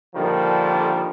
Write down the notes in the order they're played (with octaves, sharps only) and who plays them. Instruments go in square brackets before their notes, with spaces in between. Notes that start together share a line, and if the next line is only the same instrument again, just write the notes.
[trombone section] A#2 D3 D#3 F3 G3